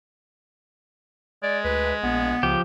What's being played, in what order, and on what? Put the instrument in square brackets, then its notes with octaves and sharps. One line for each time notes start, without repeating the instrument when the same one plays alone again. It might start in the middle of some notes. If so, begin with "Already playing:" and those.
[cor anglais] G#3 [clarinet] D5
[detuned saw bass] D2 [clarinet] B4
[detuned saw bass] A#1 [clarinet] B3
[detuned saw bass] C#2 [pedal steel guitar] F3 G4